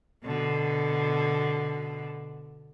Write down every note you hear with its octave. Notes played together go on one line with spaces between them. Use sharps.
B2 D3